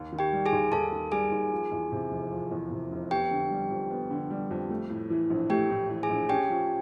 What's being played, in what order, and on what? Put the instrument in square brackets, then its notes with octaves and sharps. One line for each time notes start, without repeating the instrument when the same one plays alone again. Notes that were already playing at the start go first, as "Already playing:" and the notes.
Already playing: [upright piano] D#2
D#3
[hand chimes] G4 G5
[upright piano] G3
[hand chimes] G#4 G#5
[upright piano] D#2
[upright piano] D#2 [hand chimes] A4 A5
[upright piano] D#3
[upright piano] G3 [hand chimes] G#4 G#5
[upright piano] D#2
F3
E2
C3
F1
F3
E2
C3
F1
[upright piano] B3 [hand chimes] G4 G5
[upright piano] D3
G3
F2
B3
D3
G3
F2
A3
A2
E3
A#1
[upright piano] A3 [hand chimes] G4 G5
[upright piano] A2
E3
[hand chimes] G#4 G#5
[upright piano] A#1
[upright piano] C#4 [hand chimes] G4 G5
[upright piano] F3